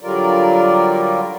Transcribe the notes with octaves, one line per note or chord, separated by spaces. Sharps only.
D3 F#3 G3 F4 A#4 D5